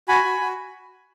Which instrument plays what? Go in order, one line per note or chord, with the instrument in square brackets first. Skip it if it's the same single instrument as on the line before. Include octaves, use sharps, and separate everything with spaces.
[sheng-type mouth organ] F#4 G#5 B5
F#4
F#4